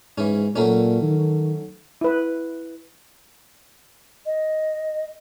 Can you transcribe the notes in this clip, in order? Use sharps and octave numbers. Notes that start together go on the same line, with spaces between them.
G#2 E3 C#4
A#2 F#3 A3 C#4
D#3
E4 B4
D#5